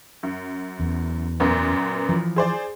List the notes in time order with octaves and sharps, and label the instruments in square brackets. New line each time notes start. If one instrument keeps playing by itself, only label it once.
[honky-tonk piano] F#2
[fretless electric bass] E2
[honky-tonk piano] F#2 A#2 B3
[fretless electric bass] E3 F3
[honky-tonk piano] G#4 C5 D5